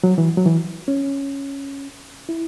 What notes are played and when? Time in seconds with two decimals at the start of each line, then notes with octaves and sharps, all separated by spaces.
0.04 F#3
0.18 E3
0.37 F#3
0.46 E3
0.88 C#4
2.29 E4